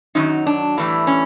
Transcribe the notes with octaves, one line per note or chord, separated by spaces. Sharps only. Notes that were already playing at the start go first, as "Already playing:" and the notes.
F#2 D#3 F#3 D#4
D4
A2 E3 G3
C#4